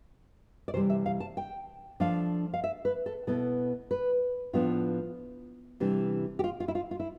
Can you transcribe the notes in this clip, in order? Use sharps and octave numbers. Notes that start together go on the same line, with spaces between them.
D5
C3 E3 G3 C5
E5
F5
A5
G5
F3 A3 D4 F5
F5
E5
B4
A4
B2 B3 E4 A4
B4
A2 F3 B3 D4 F4
C3 E3 G3 D4
G4
F4
F4
E4
F4
F4
E4